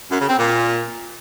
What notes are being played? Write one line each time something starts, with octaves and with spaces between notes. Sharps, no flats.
F#2
C#3
C4
A#2